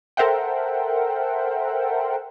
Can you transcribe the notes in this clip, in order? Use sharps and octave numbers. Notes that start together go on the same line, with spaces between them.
A4 A#4 C5 E5 F#5 G5